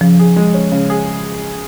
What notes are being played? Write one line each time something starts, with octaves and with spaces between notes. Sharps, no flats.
C#3 F3
G#4
G#3
C#4
C#3
G#4